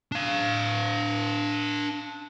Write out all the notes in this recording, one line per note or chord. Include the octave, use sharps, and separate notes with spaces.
D4 F5